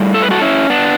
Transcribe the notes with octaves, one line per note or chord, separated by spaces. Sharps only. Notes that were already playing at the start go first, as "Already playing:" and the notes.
Already playing: A2 G3
A4
B4
F#4 A4
C#4 E4
B3 D4